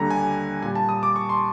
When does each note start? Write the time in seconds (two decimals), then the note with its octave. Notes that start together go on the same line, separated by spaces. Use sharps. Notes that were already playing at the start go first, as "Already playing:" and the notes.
Already playing: D#2 D3 G3 A#5
0.10 G#5
0.62 A#2 G#5
0.66 G3
0.75 A5
0.89 D#6
1.03 D6
1.16 C#6
1.29 C6